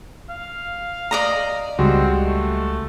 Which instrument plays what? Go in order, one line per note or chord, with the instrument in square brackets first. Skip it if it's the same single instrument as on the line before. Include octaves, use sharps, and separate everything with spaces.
[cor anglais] F5
[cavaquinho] D5 D#5 A#5
[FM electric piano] C#2 [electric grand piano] G3 G#3 F#4 [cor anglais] C4
[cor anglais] A3